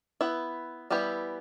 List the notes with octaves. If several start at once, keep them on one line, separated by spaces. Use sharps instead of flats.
B3 E4 B4
E3 G3 B3 E4 G4